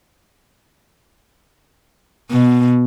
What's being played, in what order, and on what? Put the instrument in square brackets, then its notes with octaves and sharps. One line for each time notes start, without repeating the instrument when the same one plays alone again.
[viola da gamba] B2